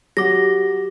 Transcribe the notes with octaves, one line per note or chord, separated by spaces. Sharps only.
F#3 G4 D6 A#6